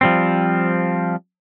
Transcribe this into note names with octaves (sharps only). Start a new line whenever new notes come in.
F3 G3 C4